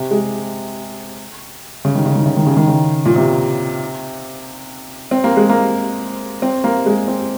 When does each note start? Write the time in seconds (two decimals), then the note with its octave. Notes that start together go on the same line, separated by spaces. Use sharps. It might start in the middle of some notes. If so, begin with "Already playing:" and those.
Already playing: C3
0.11 G#3
1.85 C#3
1.95 D#3
2.06 C#3
2.16 D#3
2.26 C#3
2.37 D#3
2.46 C#3
2.57 D#3
2.67 C#3
3.05 A#2
3.16 C3
5.11 C4
5.24 A#3
5.37 G#3
5.49 A#3
6.42 C4
6.64 A#3
6.86 G#3
7.08 C4